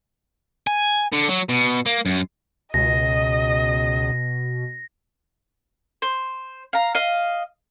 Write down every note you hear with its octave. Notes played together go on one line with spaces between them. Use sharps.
G#5
D3
F#3
B2
A#3
F#2
C#2 B2 D#5 A#6
C5
F5 A#5
D#5 F5